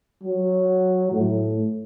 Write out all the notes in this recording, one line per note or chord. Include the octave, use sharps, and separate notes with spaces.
F#3
A2